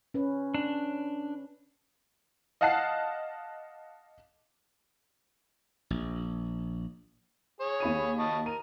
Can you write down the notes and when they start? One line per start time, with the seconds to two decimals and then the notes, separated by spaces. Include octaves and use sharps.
0.14 C#4 B4
0.54 D4
2.61 D#5 F5 F#5 A5 F#6 C7
5.90 A#1
7.60 G#4 C#5
7.80 D#2 B5 D#7
8.18 D#5 A5 C#6
8.46 A#4 D#7